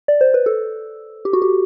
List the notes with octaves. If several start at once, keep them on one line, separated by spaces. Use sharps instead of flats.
D5
C5
B4
A4
G4
F#4
G4